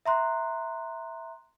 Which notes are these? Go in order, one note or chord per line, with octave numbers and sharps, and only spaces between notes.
E5 A#5 C6 F#6